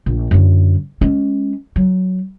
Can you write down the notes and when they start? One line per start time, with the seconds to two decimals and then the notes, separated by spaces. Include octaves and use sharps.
0.06 A#1
0.31 F#2 D3
1.01 G#3 C#4
1.76 F#3